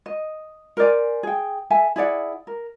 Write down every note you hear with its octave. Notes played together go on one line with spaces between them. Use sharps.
D#5
A#4 C5 D5 G#5
G#4 G5
A4 E5 G#5 A5
E4 G#4 D5 F#5
A#4